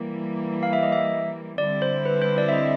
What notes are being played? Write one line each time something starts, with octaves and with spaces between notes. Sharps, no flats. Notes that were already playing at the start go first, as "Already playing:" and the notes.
Already playing: E3 G3 A#3
F5
E5
D#5
E5
D3 G3 C4 E4 D5
C5
B4
C5
D5
E5
D#5